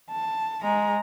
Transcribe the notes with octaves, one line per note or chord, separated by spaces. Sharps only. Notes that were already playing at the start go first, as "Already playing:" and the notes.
A5
G#3 A#5